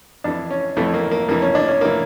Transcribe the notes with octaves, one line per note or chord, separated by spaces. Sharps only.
F2 E3 D4
C#4
F2 E3 A3
A#3
A#3
F2 E3 A#3
C#4
D4
C#4
E3 A#3